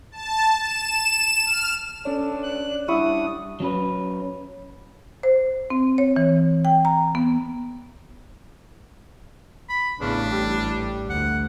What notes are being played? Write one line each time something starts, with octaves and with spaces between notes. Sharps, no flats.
A5
E7
F6
C#4 D4 A4 C#5
F#6
G3 D4 E4 F#5 C#6 D#6
F#3 C#4 B4
C5
C4
C#5
E3
G5
A#5
B3
B5
A1 E2 C#3 D4
G3
D2 F#5